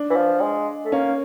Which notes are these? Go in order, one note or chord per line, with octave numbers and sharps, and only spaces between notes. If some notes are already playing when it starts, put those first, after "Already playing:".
Already playing: D4
E3
F3
G#3
A3
A#3 C#4